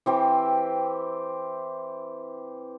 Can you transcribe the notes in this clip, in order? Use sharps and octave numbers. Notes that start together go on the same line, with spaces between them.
E3 C4 G4